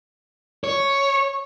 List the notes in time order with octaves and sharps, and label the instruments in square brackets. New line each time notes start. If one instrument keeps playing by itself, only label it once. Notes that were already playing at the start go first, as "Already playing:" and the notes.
[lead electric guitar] C#5